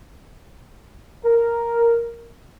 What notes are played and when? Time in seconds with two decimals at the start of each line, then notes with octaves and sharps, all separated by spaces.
1.24 A#4